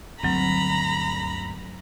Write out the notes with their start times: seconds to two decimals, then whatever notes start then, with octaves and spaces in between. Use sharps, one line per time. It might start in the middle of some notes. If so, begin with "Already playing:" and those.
0.23 G1 D2 F#3 C4 A#5 B5